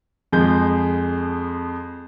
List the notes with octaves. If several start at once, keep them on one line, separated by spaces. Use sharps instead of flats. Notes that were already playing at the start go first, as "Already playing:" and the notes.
F2 F3 G#3 G#4 G6